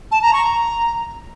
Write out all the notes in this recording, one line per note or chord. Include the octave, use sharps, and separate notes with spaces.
A5
A#5
C#6
A#5